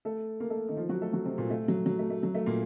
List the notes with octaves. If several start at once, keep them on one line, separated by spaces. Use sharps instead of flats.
A3 A4
A#3 A#4
A3 A4
D#3 D#4
F3 F4
F#3 F#4
A3 A4
F#3 F#4
C3 C4
A#2 A#3
A3
F#3
F#3
A3
A3
F#3
A3
A#2 A#3